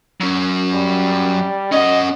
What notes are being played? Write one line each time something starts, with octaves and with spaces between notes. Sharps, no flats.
F#3 C#4
G3
C#4 D#5 F#5